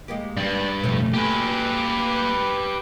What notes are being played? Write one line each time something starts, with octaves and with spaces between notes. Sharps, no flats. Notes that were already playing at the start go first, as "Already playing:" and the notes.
G#3 A#3 G4
G2 D5
B1 F2 A3 C#4
A#3 G4 B4 G#5